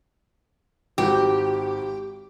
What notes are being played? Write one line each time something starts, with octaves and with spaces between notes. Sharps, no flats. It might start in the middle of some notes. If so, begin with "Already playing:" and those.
G#1 F#4 G4 G6